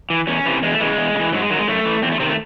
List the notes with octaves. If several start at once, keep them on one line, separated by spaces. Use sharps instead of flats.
E3
E2 C#4
C3 E3
E2 G#3
A3
C#3 E3 G#3
E2
C#3
E3
G#2 F#3
G#3
D#3 F#3
G#3
F#2 A3
E3
E2 C4
A3
C3 D#3 C4
A3